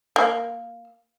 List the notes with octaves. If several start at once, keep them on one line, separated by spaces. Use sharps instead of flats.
A#3